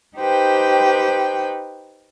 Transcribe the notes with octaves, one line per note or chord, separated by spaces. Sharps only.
D#4 G4 B4 C5 G5